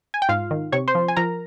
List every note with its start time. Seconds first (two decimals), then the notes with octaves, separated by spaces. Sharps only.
0.14 G#5
0.22 G5
0.29 G#2 F4 F5
0.51 D#3
0.72 C3 C#5 C#6
0.88 C5 C6
0.95 F3
1.08 G#5
1.17 F3 A#4 A#5